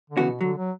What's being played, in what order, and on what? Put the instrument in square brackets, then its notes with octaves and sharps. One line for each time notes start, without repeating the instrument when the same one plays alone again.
[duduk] D3
[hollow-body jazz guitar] C#3 E3 B3 F#4
[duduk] B2
[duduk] D3 [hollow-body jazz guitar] F#3
[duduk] F#3